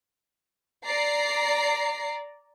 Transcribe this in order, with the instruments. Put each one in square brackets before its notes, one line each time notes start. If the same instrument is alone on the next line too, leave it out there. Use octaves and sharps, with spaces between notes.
[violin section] D5 A#5 C7